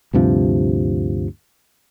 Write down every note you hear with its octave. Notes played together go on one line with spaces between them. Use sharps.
D2 G2 C3 F3